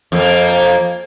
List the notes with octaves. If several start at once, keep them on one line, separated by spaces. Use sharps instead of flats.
F2 A#3